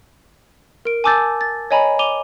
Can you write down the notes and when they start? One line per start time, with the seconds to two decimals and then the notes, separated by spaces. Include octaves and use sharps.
0.85 A#4 D7
1.04 G#5 A5 D6 E6 G6 A6
1.41 A6
1.71 C#5 D#5 G#5 A#5 B5
1.99 D6 D#7 F7 G7